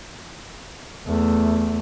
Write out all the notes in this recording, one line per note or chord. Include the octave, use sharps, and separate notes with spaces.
E2 A3